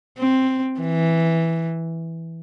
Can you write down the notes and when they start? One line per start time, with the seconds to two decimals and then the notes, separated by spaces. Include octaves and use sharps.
0.19 C4
0.80 E3